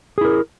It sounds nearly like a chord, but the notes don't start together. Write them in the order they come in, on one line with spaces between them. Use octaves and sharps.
G#4 E4 A#4